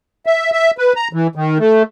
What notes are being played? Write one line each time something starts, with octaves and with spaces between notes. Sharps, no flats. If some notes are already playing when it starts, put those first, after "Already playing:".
E5
E5
B4
A#5
E3
D#3
A3